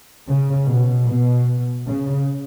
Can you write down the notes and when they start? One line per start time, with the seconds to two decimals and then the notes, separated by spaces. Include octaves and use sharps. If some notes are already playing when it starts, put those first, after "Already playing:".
0.28 C#3
0.68 B2
1.07 B2
1.86 C#3